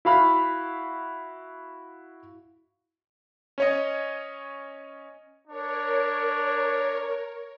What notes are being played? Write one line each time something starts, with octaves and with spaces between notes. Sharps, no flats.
E4 F#4 F5 B5 F6
C#4 C#5 D#5
D4 A#4 C#5